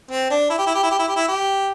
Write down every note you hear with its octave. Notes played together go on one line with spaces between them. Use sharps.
C4
D4
E4
G4
E4
G4
E4
G4
E4
G4
E4
G4